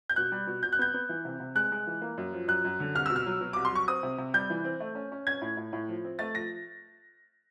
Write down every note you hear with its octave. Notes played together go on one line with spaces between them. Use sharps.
G6
B2 F#6
G3
B2
B2 G6
F#6
B3 G6
B3
E3
C3
C3
G#3 F#6
G#3
E3
A#3
F#2
F3
F#2 F#6
F#2
D3
C2 F6
B2 E6
F6
F#3
B2
C2 D6
C6
F#3 C#6
C4 D#6
C3
C3
G3 G6
E3
C4
A3
C#4
C#4
C#4 G#6
A2
A2
A2
F3
C4
A3 A6
F3 A#6